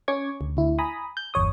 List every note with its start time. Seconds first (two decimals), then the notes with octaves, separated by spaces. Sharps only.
0.08 C#4 C#6 D6 G#6
0.41 D2
0.57 D2 E4
0.79 G#5 A#5 B5 D#6
1.17 G6
1.34 G1 E2 C#5 D#6